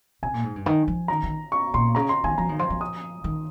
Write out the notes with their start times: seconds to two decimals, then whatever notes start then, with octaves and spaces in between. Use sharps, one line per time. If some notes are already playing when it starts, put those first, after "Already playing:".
0.23 C3 G#5
0.34 A#2
0.44 G#2
0.56 G2
0.66 D#3
0.88 F3
1.08 D#3 A#5
1.23 D#3
1.52 C#6
1.74 A#2 C6
1.95 C#3 A#5
2.09 C6
2.24 D#3 G#5
2.38 F3 A#5
2.49 D#3
2.59 F3 C6
2.70 F3
2.81 D#6
3.24 D#3